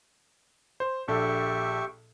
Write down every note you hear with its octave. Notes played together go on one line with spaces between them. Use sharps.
C5
A#1 D4 G4 A4 E5 C#6